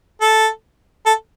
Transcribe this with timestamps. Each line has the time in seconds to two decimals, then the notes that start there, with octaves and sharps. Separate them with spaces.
0.21 A4
1.06 A4